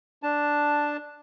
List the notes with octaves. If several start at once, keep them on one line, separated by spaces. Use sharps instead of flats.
D4 A5